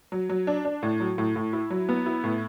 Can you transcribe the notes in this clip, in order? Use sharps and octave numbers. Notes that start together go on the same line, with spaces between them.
F#3
F#3
D4
D4
A2
F#3
A2
A2
E4
F#3
B3
E4
A2